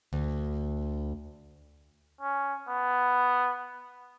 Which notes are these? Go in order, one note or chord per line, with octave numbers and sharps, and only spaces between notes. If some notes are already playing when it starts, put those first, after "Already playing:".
D2
C#4
B3